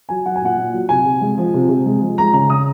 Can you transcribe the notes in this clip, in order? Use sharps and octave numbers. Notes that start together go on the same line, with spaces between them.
F#3 G#5
F#3 F#5
G#5
A#2 F#5
A#2
F#3
C3 G#5
C3
G#3
F3
C3
C3
G#3
F3
G#3 A#5
C#3 A#5
C#3 D#6